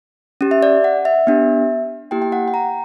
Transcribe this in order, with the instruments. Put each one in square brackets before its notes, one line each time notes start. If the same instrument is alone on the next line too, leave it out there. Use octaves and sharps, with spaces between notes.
[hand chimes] C#4 G4
E5
D5
F#5
E5
B3 D4 G4
A#3 E4 G4 G5
G5
F#5
G5
A#5